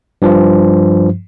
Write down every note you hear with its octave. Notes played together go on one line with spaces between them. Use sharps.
G2 F3